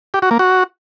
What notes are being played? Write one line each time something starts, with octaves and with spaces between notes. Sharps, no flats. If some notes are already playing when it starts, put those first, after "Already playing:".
G4
F#4
A#3
F#4